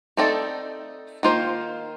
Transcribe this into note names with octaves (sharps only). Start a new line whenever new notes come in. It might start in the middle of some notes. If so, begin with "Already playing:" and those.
A3 C4 D#4 A4 D5
D#3 A#3 F4 C5